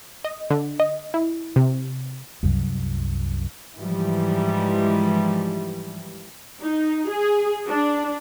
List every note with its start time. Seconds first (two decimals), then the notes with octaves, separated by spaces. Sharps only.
0.25 D#5
0.50 D3
0.80 D#5
1.14 E4
1.56 C3
2.43 C2 F#2
3.78 G#2 E3 F3 G3
6.61 D#4
7.09 G#4
7.68 D4